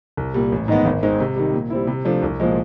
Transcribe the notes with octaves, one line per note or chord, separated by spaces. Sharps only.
C2
A#2 G3
A1
G#2 D#3 G#3 B3
G#1
G#2 D#3 G#3 C4
C3
D#3 G3
A#2
G3 C4 E4
C3
F3 A3 D4
C2
A#2 F3 G#3